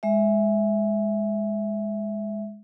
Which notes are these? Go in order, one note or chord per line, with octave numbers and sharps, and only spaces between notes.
G#3 E5